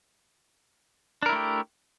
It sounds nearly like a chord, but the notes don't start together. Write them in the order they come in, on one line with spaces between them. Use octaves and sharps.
D4 A#4 E4 A3 G4